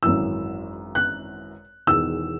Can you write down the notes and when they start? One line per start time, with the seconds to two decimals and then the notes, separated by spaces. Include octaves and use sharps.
0.03 G#1 F#2 E3 E6
0.95 F#6
1.87 E1 E2 D#3 E6